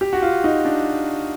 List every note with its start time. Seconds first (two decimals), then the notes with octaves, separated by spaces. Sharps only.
0.01 G4
0.13 F#4
0.22 F4
0.44 D#4
0.65 D4